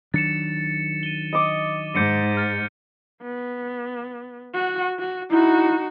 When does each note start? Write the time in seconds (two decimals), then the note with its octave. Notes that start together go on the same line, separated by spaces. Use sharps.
0.14 D#3 F#3 D4 A6 C#7 E7
1.03 D#7 G7
1.33 D#5 D6
1.95 G#2 G6 C#7 D#7
2.37 F6 A6
3.22 B3
4.54 F#4 F#5
4.99 F#4
5.30 D#4 E4 F#4